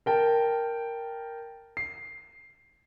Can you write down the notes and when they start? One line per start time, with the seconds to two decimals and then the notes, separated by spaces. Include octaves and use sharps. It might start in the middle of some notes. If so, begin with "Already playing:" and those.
0.06 A#4 G5 A5
1.77 C7